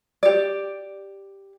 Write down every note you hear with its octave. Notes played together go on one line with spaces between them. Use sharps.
G4 D5